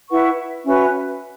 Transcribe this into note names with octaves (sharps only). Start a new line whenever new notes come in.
E4 B4 F#5 C#6
C#4 F#4 B4 E5